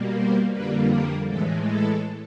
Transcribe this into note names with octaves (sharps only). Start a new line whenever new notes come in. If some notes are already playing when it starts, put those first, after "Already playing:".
Already playing: B2 G3 A#3
C5
F2 D3 G3 A#3 B4
A#4
A2 E3 G#3 A4
A4